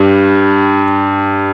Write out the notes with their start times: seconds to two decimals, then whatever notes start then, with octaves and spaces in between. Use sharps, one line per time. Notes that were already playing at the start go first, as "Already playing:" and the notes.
Already playing: G2